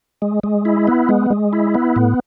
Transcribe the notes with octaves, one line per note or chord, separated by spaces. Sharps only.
G#3
G#3
E4
B3
G#3
G#3
E4
B3
A2